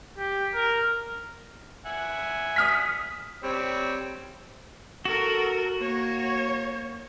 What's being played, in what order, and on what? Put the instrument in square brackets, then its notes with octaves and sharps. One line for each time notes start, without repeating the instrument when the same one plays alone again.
[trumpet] G4
A#4
[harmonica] E5 F#5 G#5
[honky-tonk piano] D#6 F6 B6
[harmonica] G3 C4 C#5
[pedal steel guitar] F#4 [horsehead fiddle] A4 A#4
[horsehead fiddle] A#3 C#5